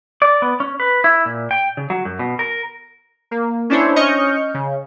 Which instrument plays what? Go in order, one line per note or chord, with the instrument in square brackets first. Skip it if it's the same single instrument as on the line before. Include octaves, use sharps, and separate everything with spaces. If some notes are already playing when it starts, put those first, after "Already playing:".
[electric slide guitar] D5
B3
C#4
B4
E4
A#2
G5
C#3
F#3
F#2
B2
A#4
[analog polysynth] A#3
C#4 D4 E4 C5 C#5
C#4 D#5 C#6 F6 G6
C#3